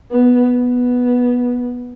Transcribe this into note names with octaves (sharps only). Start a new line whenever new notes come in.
B3
B3